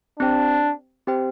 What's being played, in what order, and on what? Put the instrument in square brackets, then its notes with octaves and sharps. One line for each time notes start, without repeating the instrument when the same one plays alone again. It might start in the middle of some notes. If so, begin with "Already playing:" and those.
[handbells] C4 G4 C5 G5 [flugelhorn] D4
[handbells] C4 G4 C5 G5